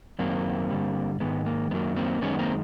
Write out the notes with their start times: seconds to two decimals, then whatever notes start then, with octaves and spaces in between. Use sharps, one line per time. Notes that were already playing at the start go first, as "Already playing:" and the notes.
0.19 F#2 D#3 F#3 A#3 C4
0.70 G2 D3 G3
1.20 G#2 D#3 G#3 B3
1.46 A#3
1.71 F#2 D#3 F#3 A#3 B3
1.96 A#3 C4
2.21 F#2 D#3 G#3 B3 C#4
2.39 A#3 C4